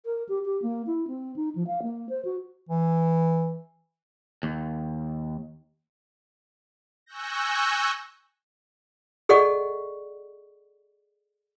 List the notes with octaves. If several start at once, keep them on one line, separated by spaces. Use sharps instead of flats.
A#4
G4
G4
A#3
E4
C4
D#4
F3
F5
A#3
C5
F#4
E3
D#2
G#5 C#6 E6 F#6 G6 A#6
G#4 A4 D5 D#5 F#5 C#6